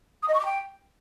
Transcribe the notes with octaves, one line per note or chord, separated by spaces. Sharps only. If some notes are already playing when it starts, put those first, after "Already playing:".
D#6
D#5
C#6
D6
G5